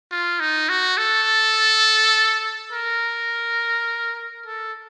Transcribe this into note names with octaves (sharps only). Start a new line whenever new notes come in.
F4
D#4
F#4
A4
A#4
A4